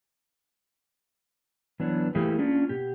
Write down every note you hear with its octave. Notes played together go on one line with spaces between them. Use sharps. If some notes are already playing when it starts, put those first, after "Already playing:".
E3 F#3 B3 D4 C#5
E3 A3 A#3 E4 G4 G#4
A#3 C#4 D4 F4
B2 G4